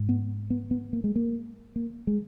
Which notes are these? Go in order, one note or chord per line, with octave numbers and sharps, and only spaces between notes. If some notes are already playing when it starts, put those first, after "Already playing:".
Already playing: G#2
B3
B3
B3
A#3
G#3
A#3
A#3
G#3